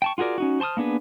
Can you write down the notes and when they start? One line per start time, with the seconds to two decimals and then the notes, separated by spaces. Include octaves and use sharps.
0.02 G5 A5 C#6
0.18 F4 F#4 G#4 A#4 D5
0.38 C#4 D#4 F#4
0.60 C5 A5 C6 D#6 F6
0.77 A#3 B3 D4 G#4 B4